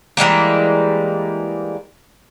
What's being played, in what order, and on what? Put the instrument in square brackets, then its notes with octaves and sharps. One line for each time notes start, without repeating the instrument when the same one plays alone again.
[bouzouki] E3 G3 G#3 A#3